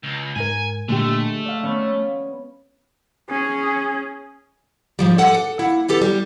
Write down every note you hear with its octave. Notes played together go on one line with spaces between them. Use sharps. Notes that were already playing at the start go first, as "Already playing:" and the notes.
C#2
G#2 A#4 G#5
A#2 D3 G#3 A3 G4
D5 F5
B3 C#4
C#4 G#4
G#2 F3 G3
A4 D5 F#5 G#5
A4
A#3 E4 F#5
E3 B3 G4 A4
G3